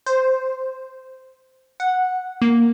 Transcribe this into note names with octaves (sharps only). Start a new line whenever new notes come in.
C5
F#5
A#3